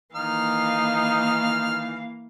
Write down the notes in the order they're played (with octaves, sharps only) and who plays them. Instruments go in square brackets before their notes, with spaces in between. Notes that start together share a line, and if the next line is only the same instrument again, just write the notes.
[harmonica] D#3 F6 [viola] E3 F5 [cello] A#3 [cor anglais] D#4